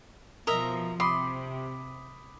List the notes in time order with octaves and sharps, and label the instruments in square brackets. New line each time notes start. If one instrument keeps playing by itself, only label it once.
[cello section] B2 F3 [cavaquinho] A#4 D#5 E5
[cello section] C3 [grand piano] B5 D6 D#6 [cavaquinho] C6